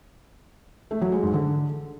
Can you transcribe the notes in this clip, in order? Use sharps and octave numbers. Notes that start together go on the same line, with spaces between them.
A3
F#3
G#3
G#2
D3